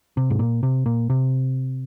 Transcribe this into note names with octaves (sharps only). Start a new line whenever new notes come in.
C3
G#2
A#2
C3
A#2
C3